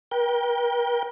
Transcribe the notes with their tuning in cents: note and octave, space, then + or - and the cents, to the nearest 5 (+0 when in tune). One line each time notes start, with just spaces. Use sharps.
A#4 +45 G5 +0